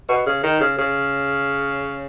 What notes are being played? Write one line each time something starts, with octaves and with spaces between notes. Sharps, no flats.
B2
C#3
D#3
C#3
C#3